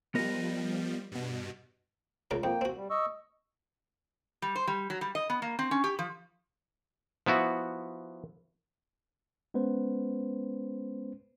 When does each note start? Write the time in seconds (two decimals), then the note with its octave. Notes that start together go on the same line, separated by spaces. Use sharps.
0.15 F3 G3 B3 A#4 D#5
1.12 G2 B2
2.31 C#2 C#3 A#4
2.44 F2 A#3 G5
2.61 C4 F#4
2.77 G3
2.90 D#5 C#6 E6
4.42 G3
4.56 C5
4.67 G3
4.90 F#3
5.01 G3
5.15 D#5
5.30 B3
5.42 A#3
5.59 C4
5.71 C#4
5.84 G4
5.99 F3
7.26 F3 B3 E4 F#4
9.54 G#3 B3 C#4 B4 C5